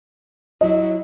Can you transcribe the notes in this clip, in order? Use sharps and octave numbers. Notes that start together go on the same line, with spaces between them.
F#3 E4 D#5